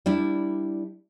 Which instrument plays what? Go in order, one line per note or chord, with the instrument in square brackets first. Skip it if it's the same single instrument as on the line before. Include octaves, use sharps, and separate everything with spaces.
[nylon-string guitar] G3 D4 E4